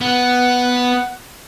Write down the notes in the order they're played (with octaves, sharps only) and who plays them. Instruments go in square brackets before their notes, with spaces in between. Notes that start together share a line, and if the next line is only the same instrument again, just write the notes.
[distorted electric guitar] B3 [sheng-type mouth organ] F#5